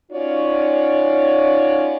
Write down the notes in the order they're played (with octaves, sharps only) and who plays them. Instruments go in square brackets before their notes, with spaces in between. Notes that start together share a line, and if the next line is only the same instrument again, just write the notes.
[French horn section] C#4 D#4 F4 F#4 C#5 D5